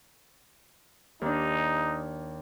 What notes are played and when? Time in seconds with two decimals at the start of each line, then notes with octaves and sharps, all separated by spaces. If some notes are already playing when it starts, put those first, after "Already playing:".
1.21 D#2 D4 D#4